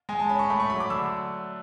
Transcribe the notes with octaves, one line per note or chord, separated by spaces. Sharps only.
G#3 G#5
A5
C#4 B5
C#6
A3 B5
C#6
F#3 B5
D6
D3 E6